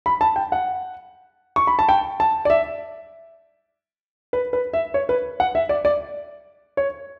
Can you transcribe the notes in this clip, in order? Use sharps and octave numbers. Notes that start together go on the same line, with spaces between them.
B5
A5
G5
F#5
C#6
B5
A5
G5
A5
D5
E5
B4
B4
E5
C#5
B4
F#5
E5
D5
D5
C#5